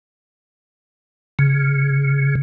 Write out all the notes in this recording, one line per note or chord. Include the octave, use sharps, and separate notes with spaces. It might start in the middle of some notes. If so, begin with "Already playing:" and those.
C#3